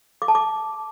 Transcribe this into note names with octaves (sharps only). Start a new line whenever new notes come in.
D6
A5
D6